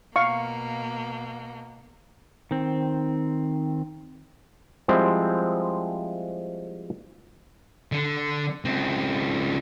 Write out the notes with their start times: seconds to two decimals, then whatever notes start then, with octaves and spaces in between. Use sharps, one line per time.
0.16 B2 A#3 F5 C#6
2.51 D#3 C4
4.88 F3 G3 G#3 C4 E4
7.92 D3
8.65 C#2 C4